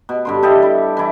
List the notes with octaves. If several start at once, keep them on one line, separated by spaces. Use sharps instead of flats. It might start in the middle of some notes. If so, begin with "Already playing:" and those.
B2
G2 D3 C6
E4 G4 A4 D#5
E4
E3 E4